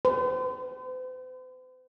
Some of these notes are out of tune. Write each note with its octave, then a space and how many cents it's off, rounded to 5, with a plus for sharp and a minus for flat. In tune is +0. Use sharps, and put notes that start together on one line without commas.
C5 -45